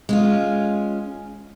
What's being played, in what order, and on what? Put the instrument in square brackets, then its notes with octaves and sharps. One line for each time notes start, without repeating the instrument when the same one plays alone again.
[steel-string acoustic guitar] G#3 C#4 F4